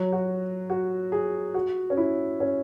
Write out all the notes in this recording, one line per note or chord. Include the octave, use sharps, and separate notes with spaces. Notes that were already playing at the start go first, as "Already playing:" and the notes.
Already playing: F#3
F#4
F#4
G#4
F#4
C#4
E4
C#4